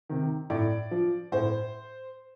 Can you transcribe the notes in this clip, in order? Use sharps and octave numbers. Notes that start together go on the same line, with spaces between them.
C3 D#3
A2 D5
F3
A2 C5